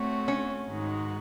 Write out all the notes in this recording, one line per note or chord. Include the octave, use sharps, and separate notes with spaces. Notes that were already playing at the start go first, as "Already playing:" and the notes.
Already playing: A3 C4 F#4 C#5
C#4
G#2 D#3 G#3 D#4 F#4